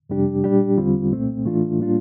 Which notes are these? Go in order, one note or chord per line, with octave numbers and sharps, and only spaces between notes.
F2 C3 G3 D4 G4
A#2 G3 D4 G4
E2 D3 G3 C4 F4
C2 A#2 A3 C4
A2 E3 A3 D4 F4
A2 G3 A#3 D4 F4